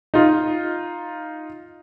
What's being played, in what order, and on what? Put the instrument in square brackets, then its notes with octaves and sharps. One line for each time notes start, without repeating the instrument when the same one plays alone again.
[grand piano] D#4 F4